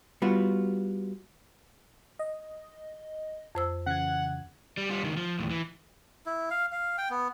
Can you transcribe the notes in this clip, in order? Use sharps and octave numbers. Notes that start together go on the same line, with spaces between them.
G3 B3 F4 F#4
D#5
F2 C5 E6
C#3 E3 F#5 G#6
G3
G3 F4
C#2 D#3
F3
D#2 A2
E3
E4
F5
F5
G5
B3